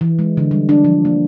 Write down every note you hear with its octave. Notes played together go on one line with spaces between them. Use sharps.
E3
G#3
D3
G3
D4
F3
A#3